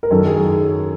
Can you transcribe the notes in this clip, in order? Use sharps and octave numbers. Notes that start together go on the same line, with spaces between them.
A#4
F#2 D#3 A4
G#4